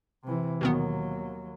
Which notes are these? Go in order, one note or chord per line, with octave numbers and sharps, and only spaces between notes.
C3 E3
D#2 B2 D#3 F#3 B3